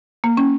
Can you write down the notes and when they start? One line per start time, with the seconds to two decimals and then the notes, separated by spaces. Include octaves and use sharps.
0.24 A#3
0.37 C#4